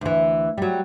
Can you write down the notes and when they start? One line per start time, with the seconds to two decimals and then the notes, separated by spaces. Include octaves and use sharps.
0.01 D2 E3
0.58 F#3 G3